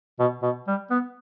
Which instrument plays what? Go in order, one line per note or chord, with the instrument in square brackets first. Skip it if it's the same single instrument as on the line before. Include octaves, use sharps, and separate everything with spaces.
[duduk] B2
B2
G3
B3